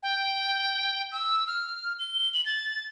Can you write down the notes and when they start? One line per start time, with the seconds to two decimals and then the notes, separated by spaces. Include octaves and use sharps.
0.03 G5
1.12 E6
1.47 F6
1.99 G7
2.34 F#7
2.46 A6